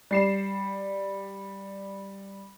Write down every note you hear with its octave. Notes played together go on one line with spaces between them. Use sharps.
G3 C7 E7